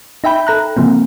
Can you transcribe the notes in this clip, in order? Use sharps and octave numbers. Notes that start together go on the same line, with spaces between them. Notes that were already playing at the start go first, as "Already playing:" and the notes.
D#4 E5 G5 B5 G6
A4 A#5 F#6
C#3 F3 A#3 C4